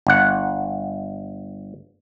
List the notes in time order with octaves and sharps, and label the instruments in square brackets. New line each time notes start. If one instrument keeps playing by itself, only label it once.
[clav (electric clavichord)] G1 F#5